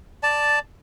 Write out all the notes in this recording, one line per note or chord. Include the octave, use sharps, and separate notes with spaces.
D5 A5